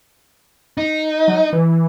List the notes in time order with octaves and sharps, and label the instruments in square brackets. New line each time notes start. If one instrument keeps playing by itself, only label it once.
[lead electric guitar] D#4
[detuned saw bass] F#3
E3